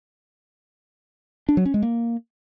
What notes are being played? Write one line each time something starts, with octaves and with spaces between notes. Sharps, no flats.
D4
F#3
C#4
G#3
A#3